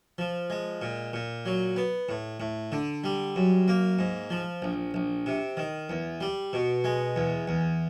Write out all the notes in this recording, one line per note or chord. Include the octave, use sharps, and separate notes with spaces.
F3
G#3
A#2
A#2
F#3
B3
A2
A2
D3
G3
F#2
A#3
G#2
F3
A#1
A#1
C3
D#3
E2
G3
B2
G#3
E2
E2